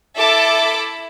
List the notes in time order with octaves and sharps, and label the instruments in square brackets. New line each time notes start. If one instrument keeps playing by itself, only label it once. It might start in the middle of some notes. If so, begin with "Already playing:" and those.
[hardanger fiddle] E4 E5 [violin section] A4 A5 D6